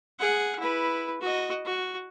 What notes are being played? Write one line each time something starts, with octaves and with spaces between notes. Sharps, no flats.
G#4 F#5
E4 B4
F#4 D#5
F#4